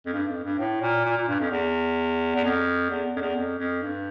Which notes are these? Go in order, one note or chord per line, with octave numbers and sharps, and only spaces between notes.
F2
G2
F2
G2
A2
A#2
A#2
A#2
G2
F2
E2
E2
F2
E2
F2
E2
F2
F2
G2